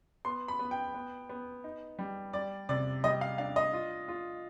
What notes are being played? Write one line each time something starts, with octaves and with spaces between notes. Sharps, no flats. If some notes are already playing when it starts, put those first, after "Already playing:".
B3 C6
B5
B3
G5
B3
B3
D#4
G3
G3 D5
C3 D5
G3 D#5
F5
D4 F5
D#5
F4
F4